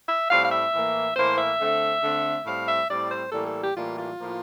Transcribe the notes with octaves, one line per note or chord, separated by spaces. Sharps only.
E5
A2 G3 C4 F5
F5
E5
A2 E3 A#3
A2 E3 A#3 C5
E5
D3 A3 C4
D3 A3 C4
A2 G3 C4 F5
E5
A2 G3 C4 D5
C5
A2 E3 G3 A#3 A4
A4
G4
A2 E3 G3 A#3 F4
F4
A2 F3 A#3